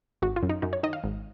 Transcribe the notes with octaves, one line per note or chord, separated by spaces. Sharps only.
G#1 F#4
F4
F#2
D#4
F#2 D#4
C#5
D#3 D#5
F5
G#1